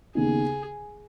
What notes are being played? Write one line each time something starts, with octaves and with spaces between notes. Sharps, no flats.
D#2 C#3 B3 D#4 G#4